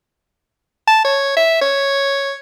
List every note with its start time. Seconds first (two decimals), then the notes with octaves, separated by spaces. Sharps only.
0.88 A5
1.05 C#5
1.37 E5
1.61 C#5